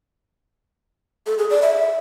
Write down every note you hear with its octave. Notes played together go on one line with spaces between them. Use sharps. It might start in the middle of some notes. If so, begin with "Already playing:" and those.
A4
G#4
D5
E5